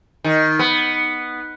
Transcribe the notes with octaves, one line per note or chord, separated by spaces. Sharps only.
D#3
B3